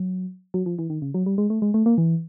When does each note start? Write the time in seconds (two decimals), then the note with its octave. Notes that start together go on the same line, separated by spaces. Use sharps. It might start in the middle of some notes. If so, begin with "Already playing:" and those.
Already playing: F#3
0.54 F#3
0.66 F3
0.79 E3
0.90 D#3
1.02 C#3
1.14 F#3
1.26 G3
1.38 G#3
1.50 A3
1.62 G#3
1.74 A3
1.86 A#3
1.98 E3